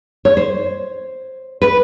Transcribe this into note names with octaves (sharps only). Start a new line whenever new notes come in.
C#5
C5
B4